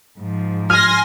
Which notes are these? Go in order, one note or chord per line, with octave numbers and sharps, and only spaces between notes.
G#2 F3
G#5 C6 F6 A#6